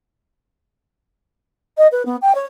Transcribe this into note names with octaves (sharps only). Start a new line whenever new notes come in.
D#5
B4
B3
G5
C#5